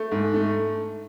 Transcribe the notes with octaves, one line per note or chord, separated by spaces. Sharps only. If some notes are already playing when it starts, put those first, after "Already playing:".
Already playing: A3
G#2
A3